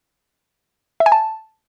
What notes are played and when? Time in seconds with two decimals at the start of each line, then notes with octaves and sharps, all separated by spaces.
1.00 E5
1.06 G#5
1.12 A5